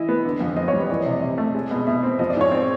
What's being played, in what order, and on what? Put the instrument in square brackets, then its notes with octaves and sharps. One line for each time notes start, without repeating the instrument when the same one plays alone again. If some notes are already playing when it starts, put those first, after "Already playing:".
Already playing: [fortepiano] E3 E4 [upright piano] D#5
[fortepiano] B3
D3
F2
[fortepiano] C4 [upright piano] D#5
[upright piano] C#5
[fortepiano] G3
[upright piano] B4
[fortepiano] E3 [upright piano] D5
[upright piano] D#5
[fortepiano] C3
[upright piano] D#5
[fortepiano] C3
A3
G#3
B2
[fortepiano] B2 [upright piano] E5
[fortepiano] C4
[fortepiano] F3 [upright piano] D#5
[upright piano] D5
[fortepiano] G#2 [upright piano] C#5
[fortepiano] C4